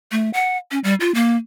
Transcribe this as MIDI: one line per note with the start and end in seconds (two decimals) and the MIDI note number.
0.12 0.30 57
0.33 0.57 78
0.71 0.79 61
0.84 0.95 55
1.00 1.13 65
1.15 1.36 58